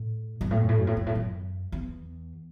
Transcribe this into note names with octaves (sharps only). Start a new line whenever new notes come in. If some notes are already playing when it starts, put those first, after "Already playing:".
Already playing: A2
F#2
A2
F#2
A2
F#2
A2
F#2
A2
F#2
E2